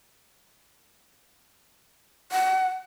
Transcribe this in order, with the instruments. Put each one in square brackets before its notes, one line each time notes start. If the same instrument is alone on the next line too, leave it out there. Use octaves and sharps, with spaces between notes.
[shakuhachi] F#5